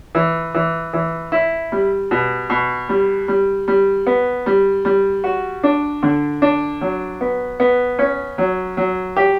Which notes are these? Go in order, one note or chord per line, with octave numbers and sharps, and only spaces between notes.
E3
E3
E3
E4
G3
B2
B2
G3
G3
G3
B3
G3
G3
F#4
D4
D3
D4
F#3
B3
B3
C#4
F#3
F#3
G4